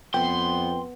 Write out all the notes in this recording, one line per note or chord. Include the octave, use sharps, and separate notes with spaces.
F2 B3 G5 C6